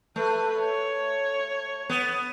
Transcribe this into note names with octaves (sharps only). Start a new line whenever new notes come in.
A3 B4
C#5
B3